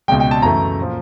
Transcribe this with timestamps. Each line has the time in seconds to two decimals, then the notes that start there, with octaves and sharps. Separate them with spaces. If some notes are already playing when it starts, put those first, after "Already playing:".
0.08 C#2 B2 G#3 G5
0.20 G5
0.31 A5
0.42 F#2 C#3 E3 A3 A#5
0.80 A#2 F3